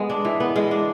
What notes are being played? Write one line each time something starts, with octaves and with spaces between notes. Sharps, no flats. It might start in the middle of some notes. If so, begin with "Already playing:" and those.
Already playing: G#3 B3
D4
E3
B3
G#3
D4